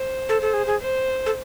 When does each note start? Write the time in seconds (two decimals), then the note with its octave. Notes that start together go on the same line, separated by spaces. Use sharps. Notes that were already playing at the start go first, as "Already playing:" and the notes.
Already playing: C5
0.29 A4
0.42 A4
0.54 G#4
0.67 G#4
0.80 C5
1.26 A4